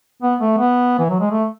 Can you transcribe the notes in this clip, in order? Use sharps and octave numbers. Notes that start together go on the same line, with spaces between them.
B3
A3
B3
E3
F#3
G#3
A3